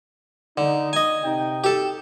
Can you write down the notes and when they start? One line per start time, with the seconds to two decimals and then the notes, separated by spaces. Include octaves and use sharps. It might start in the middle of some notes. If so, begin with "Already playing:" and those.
0.58 D3 D#4
0.93 D#5 G#5
1.23 C3 D#4 G5
1.64 G4 A4